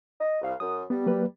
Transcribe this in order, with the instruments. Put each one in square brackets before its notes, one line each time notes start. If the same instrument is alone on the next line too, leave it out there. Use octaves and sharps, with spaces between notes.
[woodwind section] D#5
C2 F5
[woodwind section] F#2 [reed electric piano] D#6
[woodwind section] G3 [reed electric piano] B3
[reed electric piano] F#3 A#3 B4